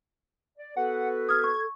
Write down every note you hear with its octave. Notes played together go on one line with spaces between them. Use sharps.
D5
B3 F#4 A4 B4 F#5
D#6 F6 G#6
C#6